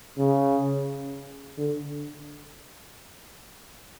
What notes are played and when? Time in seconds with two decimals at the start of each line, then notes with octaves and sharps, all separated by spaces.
0.17 C#3
1.57 D3